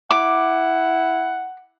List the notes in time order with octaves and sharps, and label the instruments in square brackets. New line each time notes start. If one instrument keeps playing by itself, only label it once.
[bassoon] E4 [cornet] F#5 [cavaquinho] D6